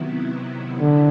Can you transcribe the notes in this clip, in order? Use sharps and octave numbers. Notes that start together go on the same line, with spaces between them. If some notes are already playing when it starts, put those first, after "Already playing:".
Already playing: C3 D#3 F#3 B3 E4
D3